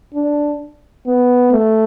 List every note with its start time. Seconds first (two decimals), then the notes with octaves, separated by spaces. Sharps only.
0.14 D4
1.06 B3
1.52 A3